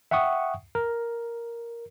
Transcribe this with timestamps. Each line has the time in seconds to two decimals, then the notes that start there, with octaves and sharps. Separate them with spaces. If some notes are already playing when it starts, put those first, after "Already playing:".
0.11 E5 F#5 G5 C#6 D#6
0.75 A#4